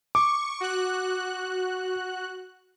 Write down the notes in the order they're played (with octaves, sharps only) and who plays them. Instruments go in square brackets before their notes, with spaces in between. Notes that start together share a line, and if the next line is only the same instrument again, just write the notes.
[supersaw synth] C#6 [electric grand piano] D6
[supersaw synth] F#4 F#6